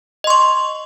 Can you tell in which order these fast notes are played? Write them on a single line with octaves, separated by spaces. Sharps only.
D#5 C6 C#6